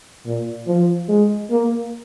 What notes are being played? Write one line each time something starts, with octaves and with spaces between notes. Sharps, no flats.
A#2
F3
G#3
A#3